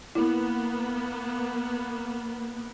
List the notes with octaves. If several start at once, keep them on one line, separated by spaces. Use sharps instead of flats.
A#3 B3 E4